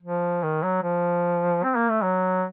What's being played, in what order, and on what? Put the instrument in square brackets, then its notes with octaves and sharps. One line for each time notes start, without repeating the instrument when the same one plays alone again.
[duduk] F3
D#3
F#3
F3
C4
A#3
A3
F#3